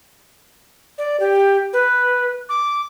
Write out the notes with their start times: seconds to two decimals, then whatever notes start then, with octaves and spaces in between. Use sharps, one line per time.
0.98 D5
1.20 G4
1.73 B4
2.49 D6